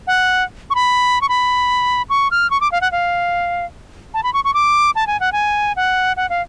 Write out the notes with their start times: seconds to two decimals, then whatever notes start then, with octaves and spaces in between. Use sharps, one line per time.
0.07 F#5
0.70 C#6
0.75 B5
1.21 C#6
1.29 B5
2.10 C#6
2.31 F6
2.51 C#6
2.61 D6
2.72 F5
2.81 F#5
2.92 F5
4.14 A5
4.24 B5
4.34 C#6
4.44 C#6
4.54 D6
4.95 A5
5.07 G#5
5.20 F#5
5.32 G#5
5.76 F#5
6.17 F#5
6.30 F5